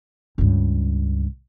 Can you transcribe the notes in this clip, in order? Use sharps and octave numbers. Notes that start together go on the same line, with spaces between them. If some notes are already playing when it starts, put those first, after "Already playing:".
C#2 G2